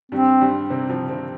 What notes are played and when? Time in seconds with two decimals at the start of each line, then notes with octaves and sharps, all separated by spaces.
0.12 G2 G3 C4
0.41 G2 G3
0.70 C3 C4
0.89 F3 F4
1.09 C3 C4